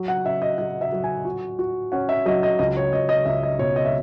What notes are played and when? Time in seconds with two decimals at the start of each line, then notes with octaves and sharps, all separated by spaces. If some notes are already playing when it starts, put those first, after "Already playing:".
Already playing: F#3
0.08 F#5
0.25 C#4 E5
0.42 D#5
0.58 F#3 D#5
0.81 E5
0.92 F#3
1.04 G#5
1.25 F#4
1.59 F#4
1.92 C#4 F#5
2.09 E5
2.26 F#3 D#5
2.43 D#5
2.59 C#2 D#5
2.77 C#5
2.93 C#2 D#5
3.09 D#5
3.26 C#2 E5
3.43 D#5
3.59 B2 C#5
3.76 D#5
3.85 E5